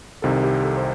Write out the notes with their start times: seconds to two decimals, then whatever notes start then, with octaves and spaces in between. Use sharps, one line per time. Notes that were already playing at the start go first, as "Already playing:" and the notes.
0.22 C2 C3 D#3 A4
0.44 G4
0.64 A4
0.77 C5